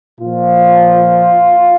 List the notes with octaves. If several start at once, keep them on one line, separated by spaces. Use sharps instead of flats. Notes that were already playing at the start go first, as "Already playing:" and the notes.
A#2 F3 F4